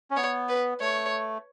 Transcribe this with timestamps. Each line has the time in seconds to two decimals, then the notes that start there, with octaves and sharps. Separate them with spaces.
0.11 C#4
0.16 B3 C#5
0.49 B4
0.81 A3 C#5